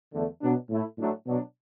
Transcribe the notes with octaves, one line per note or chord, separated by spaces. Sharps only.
E2 D3 A3
B2 F#3 B3 D4
A2 A3 E4
A2 F#3 A3 D4
B2 F#3 D4